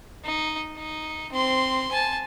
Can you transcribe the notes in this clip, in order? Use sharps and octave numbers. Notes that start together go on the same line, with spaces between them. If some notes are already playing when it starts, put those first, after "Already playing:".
D#4
D#4
C4 C6
G#5 A5